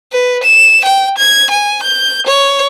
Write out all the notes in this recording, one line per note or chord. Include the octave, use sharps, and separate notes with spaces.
B4
E7
G5
G#6
G#5
G6
C#5